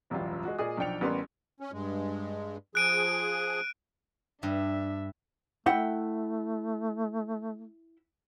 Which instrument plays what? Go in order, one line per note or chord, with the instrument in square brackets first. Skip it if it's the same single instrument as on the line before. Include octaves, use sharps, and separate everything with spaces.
[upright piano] E1 A1 F#2 G3 F4
G#3 F#4
A#2 G#4 D5 D#5 D#6
B1 F3 D4 G5 C#7 F7
A1 G3 B3 C#4 A#4 C6
[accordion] C#4
G2 G#3
[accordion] F3 G#4 [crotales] F#6 D7 D#7
[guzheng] G2 [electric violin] D4 E5
[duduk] A3 [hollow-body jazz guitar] E4 F#5 G5